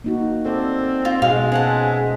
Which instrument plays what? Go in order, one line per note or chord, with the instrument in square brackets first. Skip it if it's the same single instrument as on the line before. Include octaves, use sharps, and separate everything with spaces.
[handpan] A#3 D#4 F#4
[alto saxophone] C4 [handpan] A4 D5
[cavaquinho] F4
[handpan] B2 F#4 [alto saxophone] G#3 [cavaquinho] F5 C6
[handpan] C#4 C5 E5 [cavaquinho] G#4 F#5 A5